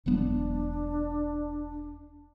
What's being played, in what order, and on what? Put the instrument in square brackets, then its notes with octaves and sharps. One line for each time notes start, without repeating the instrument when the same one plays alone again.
[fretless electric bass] E1 F#3 B3 [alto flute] D4